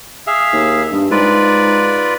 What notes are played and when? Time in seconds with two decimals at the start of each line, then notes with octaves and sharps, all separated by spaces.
0.27 G#4 E5 F5
0.53 D#2
0.92 G2
1.11 G#2 F4 B4 D5